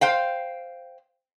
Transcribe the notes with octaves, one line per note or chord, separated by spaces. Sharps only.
C5 F5 G5